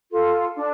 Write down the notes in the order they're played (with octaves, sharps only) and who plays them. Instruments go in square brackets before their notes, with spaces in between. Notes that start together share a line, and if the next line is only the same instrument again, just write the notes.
[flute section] F4 A4
D4